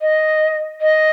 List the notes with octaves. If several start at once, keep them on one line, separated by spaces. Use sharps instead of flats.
D#5
D#5